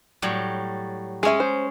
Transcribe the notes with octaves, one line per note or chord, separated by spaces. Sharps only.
A2 F#3 G3
G#3 C#4 G#4 C#5 E5
C5